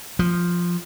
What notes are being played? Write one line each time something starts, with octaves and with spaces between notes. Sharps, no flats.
F3